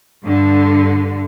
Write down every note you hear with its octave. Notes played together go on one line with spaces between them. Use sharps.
G2 D3